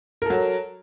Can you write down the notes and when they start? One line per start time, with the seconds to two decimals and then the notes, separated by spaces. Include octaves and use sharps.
0.22 A#4
0.26 A4
0.30 F#3